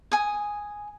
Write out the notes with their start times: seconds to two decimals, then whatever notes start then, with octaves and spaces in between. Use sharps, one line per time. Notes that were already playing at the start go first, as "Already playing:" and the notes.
0.12 G#5 D#6